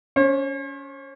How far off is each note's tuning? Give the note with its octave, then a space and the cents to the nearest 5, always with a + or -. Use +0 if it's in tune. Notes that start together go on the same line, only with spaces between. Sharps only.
C#4 +25 C#5 -45